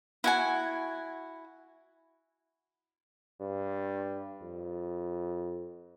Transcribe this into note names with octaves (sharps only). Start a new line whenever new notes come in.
E4 F#4 G#5
G2
F2